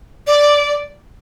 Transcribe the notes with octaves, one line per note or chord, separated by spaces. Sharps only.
D5